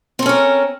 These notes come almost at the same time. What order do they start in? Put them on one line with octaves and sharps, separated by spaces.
C4 A4 C#4 A#4